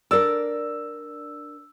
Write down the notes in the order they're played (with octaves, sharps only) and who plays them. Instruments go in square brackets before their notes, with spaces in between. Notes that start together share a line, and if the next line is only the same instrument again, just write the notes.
[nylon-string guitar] D4 A#4 D5 [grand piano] E6